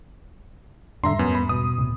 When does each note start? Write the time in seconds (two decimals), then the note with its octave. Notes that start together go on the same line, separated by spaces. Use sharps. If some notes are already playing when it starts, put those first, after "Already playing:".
1.04 E2 G#2 D3 G3 E5 A#5 C6
1.19 F#2 B3
1.35 B5
1.49 B2 D#6
1.78 D2 A2 C3